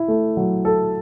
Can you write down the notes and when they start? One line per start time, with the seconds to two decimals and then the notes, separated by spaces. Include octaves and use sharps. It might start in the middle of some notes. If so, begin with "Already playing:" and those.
Already playing: E4
0.08 A3
0.37 F#3
0.65 A4